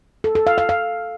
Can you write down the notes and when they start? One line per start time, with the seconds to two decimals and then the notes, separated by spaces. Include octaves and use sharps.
0.24 A4
0.35 A4
0.47 F5
0.58 F5
0.69 F5